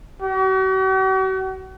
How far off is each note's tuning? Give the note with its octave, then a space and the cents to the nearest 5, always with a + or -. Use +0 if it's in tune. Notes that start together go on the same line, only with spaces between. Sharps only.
F#4 +45